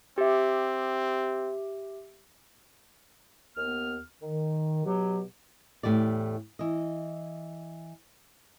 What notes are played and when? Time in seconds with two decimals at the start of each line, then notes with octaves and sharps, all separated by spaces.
0.18 C4 G4 E5
3.56 D#2 B3 F6
4.21 D#3
4.85 B2 F#3 G4
5.83 E2 A2 E3 G4 D5
6.59 E3 D#5